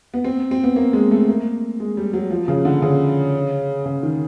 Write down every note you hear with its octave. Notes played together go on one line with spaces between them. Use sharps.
B3
C4
C4
B3
A#3
G#3
A3
A#3
G#3
G3
F#3
F3
C#3
D3
C#3
C#3
D#3